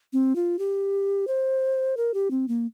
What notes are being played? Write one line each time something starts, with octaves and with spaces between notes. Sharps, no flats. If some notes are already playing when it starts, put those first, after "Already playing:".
C4
F4
G4
C5
A#4
G4
C4
A#3